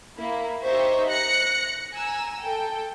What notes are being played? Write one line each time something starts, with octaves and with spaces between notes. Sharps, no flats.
A#3 E4
D#4 G4 C5 E5 C#6
F#6 A#6 C#7
G#5 A#5 E6
A4 G5